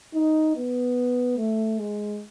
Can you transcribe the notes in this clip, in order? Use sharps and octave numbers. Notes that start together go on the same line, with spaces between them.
D#4
B3
A3
G#3